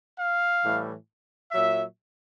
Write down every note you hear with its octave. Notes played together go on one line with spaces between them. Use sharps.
F5
A2 E3 G3
A#2 F#3 E5